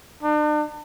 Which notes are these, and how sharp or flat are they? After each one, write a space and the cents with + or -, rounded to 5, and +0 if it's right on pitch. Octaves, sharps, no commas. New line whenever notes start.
D4 +40